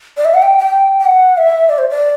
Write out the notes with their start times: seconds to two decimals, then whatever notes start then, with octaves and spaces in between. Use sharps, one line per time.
0.17 D5
0.25 E5
0.34 F#5
0.42 G5
0.58 G5
0.99 G5
1.05 F#5
1.37 E5
1.69 D5
1.78 C5
1.89 D5